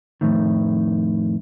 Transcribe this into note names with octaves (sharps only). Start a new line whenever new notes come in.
F2 A2 D#3